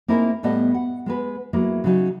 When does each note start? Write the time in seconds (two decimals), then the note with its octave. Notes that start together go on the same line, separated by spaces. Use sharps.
0.08 A#3 C4 D#4 E4 G#4 A#4
0.43 A2 G3 B3 A4 D#5
0.74 F#5
1.06 G#3 B3 B4
1.53 F#3 G#3 A#3 B3 E4
1.84 C#3 F#3 D#4